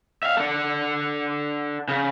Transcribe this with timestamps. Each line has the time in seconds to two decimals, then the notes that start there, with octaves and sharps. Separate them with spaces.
0.23 E5 F5
0.37 D4 A4
1.88 C#3